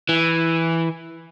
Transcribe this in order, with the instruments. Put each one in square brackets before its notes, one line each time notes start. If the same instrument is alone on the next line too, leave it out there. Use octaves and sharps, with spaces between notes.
[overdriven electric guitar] E3